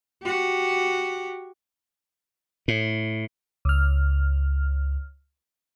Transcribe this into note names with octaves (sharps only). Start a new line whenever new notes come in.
F#4 G4
A2
C#2 F6